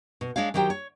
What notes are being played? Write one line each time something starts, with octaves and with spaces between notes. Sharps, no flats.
B2
G#3 D4 C#5 F5
D#3 F#3 G4 C5 G5
C#5